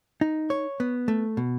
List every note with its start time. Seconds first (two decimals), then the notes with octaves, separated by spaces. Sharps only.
0.21 D#4
0.50 C#5
0.80 B3
1.08 A3
1.37 B2